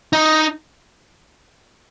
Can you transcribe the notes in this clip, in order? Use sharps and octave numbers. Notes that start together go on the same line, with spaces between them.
D#4